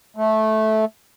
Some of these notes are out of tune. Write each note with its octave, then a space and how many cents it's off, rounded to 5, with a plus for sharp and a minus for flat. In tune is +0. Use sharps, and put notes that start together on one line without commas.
A3 -15